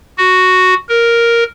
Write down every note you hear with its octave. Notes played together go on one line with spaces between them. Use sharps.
F#4
A#4